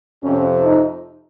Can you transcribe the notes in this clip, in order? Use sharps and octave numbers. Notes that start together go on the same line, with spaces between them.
F2 C3 F3 C#4
D#4